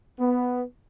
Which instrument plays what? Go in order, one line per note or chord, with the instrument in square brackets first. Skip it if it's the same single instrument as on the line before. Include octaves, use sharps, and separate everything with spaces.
[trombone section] B3